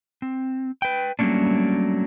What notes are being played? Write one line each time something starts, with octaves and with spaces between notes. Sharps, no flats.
C4
B4 G5
F#3 G3 A3 A#3 C#4 D4